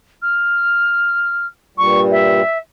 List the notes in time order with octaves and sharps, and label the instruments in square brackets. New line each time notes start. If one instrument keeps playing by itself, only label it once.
[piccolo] F6
[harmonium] G2 A#2 G3 [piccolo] C#6
[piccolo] E5